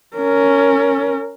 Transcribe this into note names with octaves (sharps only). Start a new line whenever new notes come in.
C#4 A#4